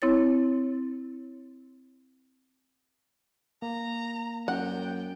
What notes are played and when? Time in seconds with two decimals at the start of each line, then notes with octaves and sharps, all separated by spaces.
0.02 C4 E4 C#5 A6
3.62 A#3 A#5
4.48 F#2 F#5 G5